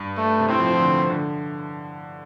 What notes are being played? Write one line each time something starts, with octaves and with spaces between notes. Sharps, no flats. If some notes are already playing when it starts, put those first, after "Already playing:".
Already playing: G2
A3
C3
A2 C4
F3
F3
D3
D3